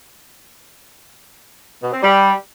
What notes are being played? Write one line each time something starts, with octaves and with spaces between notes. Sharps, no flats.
B2
C4
G3